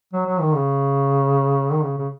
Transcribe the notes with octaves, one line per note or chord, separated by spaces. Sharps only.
F#3
F#3
D#3
C#3
D#3
C#3
C#3